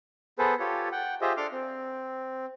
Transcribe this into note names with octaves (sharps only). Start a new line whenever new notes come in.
B3 G#4 A4 B4 C5
F4 G4 A4 C#5
F#5 G5
F4 G4 G#4 C5 D#5 E5
D4 A4 C6 D6 F6
C4